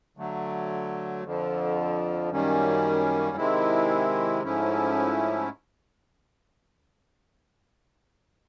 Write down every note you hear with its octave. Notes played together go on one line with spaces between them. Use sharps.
D3 F#3 A3
F2 D3 F3
F#2 D#3 G3 A#3 C#4
C3 D#3 G#3 C4 E4
G#2 F3 A3 C#4 E4